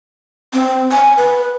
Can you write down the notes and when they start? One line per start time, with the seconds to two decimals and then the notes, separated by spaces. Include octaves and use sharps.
0.53 C4
0.91 G#5
1.17 B4